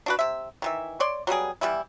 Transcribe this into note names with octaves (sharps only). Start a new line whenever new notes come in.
D4 F#4 B4
C3 E5
D#3 E3 E5
C#5 D5 C6
F#3 G3 B3 G#4
E3 G3 B3 E4